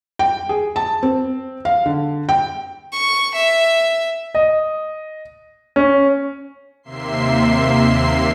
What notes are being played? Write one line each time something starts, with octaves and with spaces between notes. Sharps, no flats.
G5
G#4
A5
C4
F5
D3
G5
C#6
E5
D#5
C#4
D#2 C3 A#3 E5 C6 C7